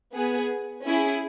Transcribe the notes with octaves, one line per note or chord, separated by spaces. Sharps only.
B3 G#4
C#4 E4 G#4